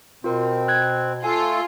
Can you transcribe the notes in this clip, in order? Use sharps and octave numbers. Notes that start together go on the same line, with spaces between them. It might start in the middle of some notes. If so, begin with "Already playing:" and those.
B2 C4 F4 A#4
F#6 G#6
A3 F4 A4 G#5